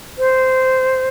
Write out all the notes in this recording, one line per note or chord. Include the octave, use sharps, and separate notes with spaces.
C5